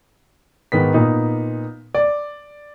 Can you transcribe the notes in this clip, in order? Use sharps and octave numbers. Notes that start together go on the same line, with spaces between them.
G#2 D#3 B3 B6
A#2 B3 D#4
D5